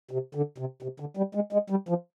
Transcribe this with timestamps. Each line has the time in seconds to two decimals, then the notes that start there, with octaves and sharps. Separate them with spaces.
0.11 C3
0.35 D3
0.58 C3
0.82 C3
1.00 D3
1.17 G3
1.35 G#3
1.53 G#3
1.70 G3
1.89 F3